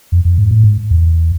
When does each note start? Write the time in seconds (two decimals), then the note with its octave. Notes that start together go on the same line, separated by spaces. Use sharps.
0.12 F2
0.25 F2
0.38 G#2
0.51 A2
0.64 G#2
0.91 E2